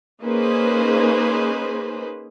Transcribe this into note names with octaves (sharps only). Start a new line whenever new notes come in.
A#3 C#4 D#4 G#4 B4 C5